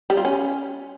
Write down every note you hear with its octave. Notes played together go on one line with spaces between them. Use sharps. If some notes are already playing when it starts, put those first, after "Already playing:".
G3
F4
C#4